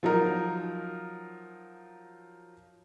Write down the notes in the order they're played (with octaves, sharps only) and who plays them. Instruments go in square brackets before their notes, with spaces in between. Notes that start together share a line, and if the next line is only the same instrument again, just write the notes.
[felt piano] F3 F#3 D#4 A#4